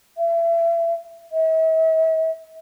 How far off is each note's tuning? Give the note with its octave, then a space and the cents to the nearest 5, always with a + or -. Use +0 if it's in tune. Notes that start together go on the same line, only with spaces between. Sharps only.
E5 +35
E5 -45